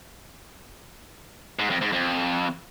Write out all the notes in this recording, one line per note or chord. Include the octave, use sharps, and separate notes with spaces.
G#2
F2
G#2
F2